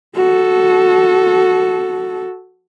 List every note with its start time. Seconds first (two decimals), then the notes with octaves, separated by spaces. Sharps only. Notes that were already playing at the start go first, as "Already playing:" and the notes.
0.16 F#4 A4